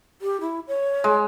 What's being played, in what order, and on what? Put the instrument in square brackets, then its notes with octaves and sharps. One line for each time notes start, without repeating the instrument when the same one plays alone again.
[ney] G4
E4
C#5
[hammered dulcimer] G#3